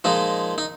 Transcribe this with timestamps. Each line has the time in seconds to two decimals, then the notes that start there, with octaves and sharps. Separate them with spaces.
0.04 A#2 F3 G#3 D#4
0.58 D#4